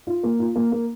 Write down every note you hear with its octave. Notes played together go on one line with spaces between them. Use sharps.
F4
A#3
F4
A#3
A#3